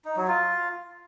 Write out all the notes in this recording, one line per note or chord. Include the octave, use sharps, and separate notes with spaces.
D#4
F#3
F4